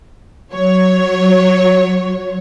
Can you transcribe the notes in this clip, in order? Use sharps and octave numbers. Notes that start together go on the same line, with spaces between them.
F#3 C#5